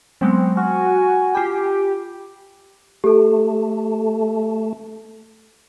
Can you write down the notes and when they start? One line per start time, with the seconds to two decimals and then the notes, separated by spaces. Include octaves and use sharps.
0.21 F#3 G#3 B3 C4
0.57 F#4 G#5 F6
1.35 F4 G4 B5
3.04 A3 G4 A4